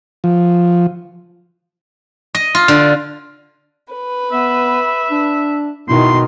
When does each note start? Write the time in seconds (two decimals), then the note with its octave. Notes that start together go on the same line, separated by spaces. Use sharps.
0.24 F3
2.35 D#5
2.55 F4
2.68 D3
3.94 B4
4.32 B3 E5
5.11 D4
5.88 B2 D#3 E4 C6